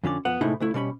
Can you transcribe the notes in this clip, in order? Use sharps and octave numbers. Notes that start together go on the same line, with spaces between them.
F2 D3 C#4 D5
F2 B3 F#5
A2 C3 G#3 D#4 E4
C#2 A3 E4
B2 G3 C#4 B5